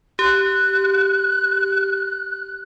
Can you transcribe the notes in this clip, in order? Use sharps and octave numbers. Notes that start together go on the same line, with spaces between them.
G4 F#6